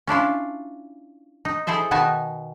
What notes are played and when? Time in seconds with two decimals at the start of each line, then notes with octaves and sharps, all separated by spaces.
0.07 C#4 D4 E4 F4
1.45 D#4
1.67 E4 G#4 A4 C5 E5
1.91 B2 D#3 B3 D#4 G#5 A5